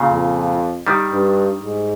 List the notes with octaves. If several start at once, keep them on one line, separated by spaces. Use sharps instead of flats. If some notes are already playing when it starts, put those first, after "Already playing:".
Already playing: A#2 C#3
F2
D#3 G3
G2
G#2